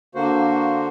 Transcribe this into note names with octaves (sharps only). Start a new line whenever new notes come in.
D3 A#3 F#4 C5